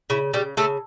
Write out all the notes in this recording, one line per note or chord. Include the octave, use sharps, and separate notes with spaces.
C#3 E4
C#3 G3 G4
C#3 A3 A4